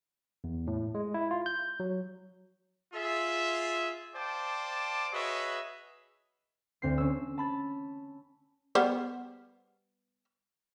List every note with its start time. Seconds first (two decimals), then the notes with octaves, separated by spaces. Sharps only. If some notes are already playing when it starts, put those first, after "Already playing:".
0.44 E2
0.67 A2
0.95 G#3
1.14 E4
1.31 F4
1.46 G6
1.80 F#3
2.94 F4 G#4 E5
4.15 C5 D5 F5 G5 A5 D6
5.13 F#4 G#4 B4 C#5 D#5 E5
6.82 D2 C4 G6 C7
6.98 C#4 E6
7.38 A5 B5 A6
8.75 G3 B3 C5